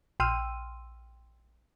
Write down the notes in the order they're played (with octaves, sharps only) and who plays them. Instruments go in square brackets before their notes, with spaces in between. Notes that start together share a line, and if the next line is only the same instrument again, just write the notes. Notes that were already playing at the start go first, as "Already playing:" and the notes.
[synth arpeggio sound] A#1 G5 C6 E6 F6 D#7